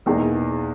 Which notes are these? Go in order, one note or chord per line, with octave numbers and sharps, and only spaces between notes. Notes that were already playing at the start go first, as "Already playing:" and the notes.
E2 B2 A#3 D#4 G#4